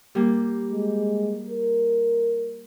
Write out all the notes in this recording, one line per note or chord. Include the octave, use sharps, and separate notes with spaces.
G3 A#3
G#3
A#4